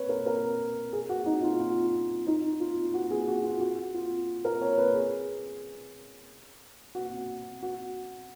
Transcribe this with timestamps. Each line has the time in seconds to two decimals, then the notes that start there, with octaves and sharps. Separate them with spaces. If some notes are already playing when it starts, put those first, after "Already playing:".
Already playing: B4 C#5
0.09 A#4
0.26 A#4
0.93 G#4
1.09 F#4
1.26 D#4
1.43 F4
1.60 F4
2.27 D#4
2.60 F4
2.94 F#4
3.11 G#4
3.27 F#4
3.44 F4
3.60 F#4
3.94 F4
4.45 A#4
4.62 C#5
4.78 B4
4.94 G#4
6.95 F#4
7.63 F#4